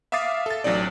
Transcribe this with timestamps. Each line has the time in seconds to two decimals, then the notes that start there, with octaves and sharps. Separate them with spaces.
0.12 E5 F5 D6 D#6 A6 C7
0.46 A4 A6
0.64 A1 F#3 C4 D#4 D5